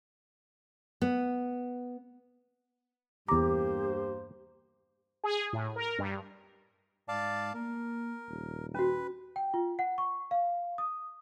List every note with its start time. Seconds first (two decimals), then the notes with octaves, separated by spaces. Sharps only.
1.02 B3
3.28 E2 G2 A#3 G4 C5 A#5 D6
5.24 G#4
5.53 A2
5.76 A#4
5.98 G2
7.08 G#2 D5 F5 A5
7.54 A#3 A#4
8.29 D#1
8.74 C#4 F#4 B4
9.36 G5
9.54 F4
9.79 F#5
9.98 C#6
10.31 F5
10.78 D#6